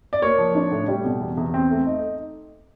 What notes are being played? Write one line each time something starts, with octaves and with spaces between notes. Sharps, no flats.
D5
A#3 C#5
F3
D4
A2
G3
B2
E2
E2
C4
A3
D#4